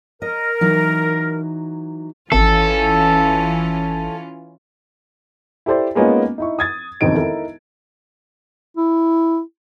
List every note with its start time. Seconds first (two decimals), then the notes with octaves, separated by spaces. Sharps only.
0.22 A#4 D#5
0.61 E3 F#3 D#4
2.32 G#1 E3 C#4 F4 A4
5.66 E4 G4 A4 C5 D5
5.95 G#3 A#3 B3 C#4 D#4 F4
6.38 D#4 E4 C#6
6.59 D#6 G#6 A6
7.01 E1 F2 D#3 C4 D#4 D7
7.15 D#4 E4 A4 A#4
8.77 E4